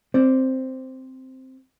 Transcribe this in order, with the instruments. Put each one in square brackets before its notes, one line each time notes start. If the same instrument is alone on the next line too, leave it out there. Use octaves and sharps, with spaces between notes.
[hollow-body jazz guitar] C4 C5 D5